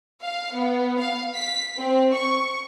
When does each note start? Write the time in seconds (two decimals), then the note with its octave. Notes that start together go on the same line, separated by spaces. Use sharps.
0.23 F5
0.53 B3
0.99 F5
1.35 B6
1.78 C4
2.14 C#6